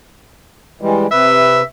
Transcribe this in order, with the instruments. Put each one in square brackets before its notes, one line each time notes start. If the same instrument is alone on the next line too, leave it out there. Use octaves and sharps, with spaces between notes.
[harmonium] E3 G3 G#3
[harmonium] C3 B4 [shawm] E5